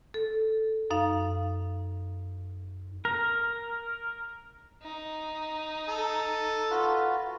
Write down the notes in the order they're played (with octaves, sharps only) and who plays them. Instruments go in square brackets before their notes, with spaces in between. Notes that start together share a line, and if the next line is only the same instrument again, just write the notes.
[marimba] A4
F#2 D#4 F5
[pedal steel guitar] A#4
[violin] D#4
[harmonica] A4
[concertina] F4 F#4 B4